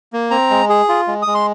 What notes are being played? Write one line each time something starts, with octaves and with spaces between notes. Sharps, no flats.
A#3
C4 A#5
G#3
G#4
F4
G#3
G#3 D#6
C6